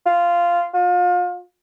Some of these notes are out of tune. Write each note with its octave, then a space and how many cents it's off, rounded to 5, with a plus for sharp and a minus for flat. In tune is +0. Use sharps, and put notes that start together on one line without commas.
F4 -10
F4 +35